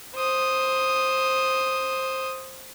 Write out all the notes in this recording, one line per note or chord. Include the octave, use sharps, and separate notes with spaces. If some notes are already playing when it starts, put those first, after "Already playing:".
C5 D#6